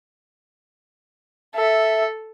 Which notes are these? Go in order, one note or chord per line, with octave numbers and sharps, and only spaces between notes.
A4 E5